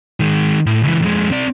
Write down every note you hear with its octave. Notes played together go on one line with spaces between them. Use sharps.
D#3 G#3
A2
C#2 E3
F2 G#3
C4 D5